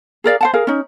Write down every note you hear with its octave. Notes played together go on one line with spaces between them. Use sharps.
G#4 A#4 D5 F5
C5 F#5 A5
G#4 A#4 F5
C#4 D#4